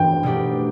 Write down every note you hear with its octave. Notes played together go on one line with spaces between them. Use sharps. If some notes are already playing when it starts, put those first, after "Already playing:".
Already playing: G2 E3 G5
B2 A3 D4 G4